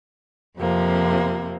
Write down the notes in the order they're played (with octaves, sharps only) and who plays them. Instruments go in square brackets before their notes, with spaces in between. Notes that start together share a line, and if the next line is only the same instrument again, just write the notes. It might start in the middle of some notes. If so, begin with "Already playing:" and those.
[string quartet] F2 C3 F3 A#3